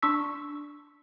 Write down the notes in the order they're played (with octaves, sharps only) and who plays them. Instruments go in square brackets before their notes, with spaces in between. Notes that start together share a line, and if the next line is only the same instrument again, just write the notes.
[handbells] D4 C6 C#6 E6 B6